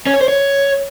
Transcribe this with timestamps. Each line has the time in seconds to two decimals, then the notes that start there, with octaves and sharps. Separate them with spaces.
0.07 C#4
0.14 C#5
0.21 C5
0.28 C#5